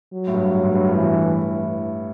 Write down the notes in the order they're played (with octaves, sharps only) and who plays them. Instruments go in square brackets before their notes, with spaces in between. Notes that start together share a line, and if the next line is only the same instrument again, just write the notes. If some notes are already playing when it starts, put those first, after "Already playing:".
[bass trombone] F#3
[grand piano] A2
G2
G2
A2
G2
G2
[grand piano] A2 [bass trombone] E3
[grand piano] G2